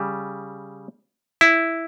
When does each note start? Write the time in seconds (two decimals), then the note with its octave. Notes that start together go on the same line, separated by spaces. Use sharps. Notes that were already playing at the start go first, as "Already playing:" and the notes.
Already playing: C#3 G3
1.41 E4